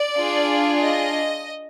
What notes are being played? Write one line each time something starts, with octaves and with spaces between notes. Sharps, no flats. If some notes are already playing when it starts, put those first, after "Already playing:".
Already playing: D5
D4 F4 G#4
D#5